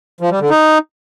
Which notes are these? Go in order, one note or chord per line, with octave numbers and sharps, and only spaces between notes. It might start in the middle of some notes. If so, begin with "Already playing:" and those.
F3
G3
D3
D#4